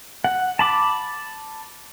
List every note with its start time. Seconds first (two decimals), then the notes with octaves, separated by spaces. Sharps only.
0.24 F#5
0.59 A5 B5 D6